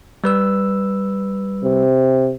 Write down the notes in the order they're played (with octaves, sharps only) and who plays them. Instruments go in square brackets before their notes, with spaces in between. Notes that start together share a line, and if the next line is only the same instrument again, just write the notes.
[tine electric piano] G3 B4 E6
[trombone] C3